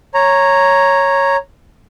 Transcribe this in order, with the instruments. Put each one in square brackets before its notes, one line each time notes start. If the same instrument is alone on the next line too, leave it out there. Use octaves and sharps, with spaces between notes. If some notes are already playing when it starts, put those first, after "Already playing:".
[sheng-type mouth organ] C#5 A#5